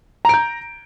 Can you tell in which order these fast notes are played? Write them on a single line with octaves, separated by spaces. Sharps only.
A#5 D7 G6